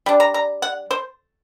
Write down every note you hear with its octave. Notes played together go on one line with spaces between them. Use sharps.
G3 D4
A#5
A#5
F#5
C5